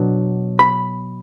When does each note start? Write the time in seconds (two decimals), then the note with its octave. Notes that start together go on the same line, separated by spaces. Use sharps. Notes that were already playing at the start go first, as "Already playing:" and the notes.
Already playing: B2 F#3 B3 D4
0.59 B5